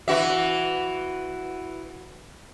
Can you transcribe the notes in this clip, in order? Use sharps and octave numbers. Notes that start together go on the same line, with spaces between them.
E3 F#4 E5